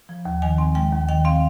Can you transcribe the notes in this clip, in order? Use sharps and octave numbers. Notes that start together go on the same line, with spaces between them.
F3
D#2
D#3 G#5
C4
G#3 G5
D#2
D#3 G5
C4 F5